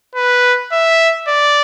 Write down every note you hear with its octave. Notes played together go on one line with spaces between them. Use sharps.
B4
E5
D5